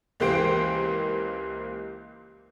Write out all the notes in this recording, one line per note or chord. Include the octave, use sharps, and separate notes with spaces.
C#2 E3 A#3 G4 C5 D7